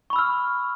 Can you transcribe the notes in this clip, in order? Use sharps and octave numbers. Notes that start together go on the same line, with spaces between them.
B5 C#6 E6 F6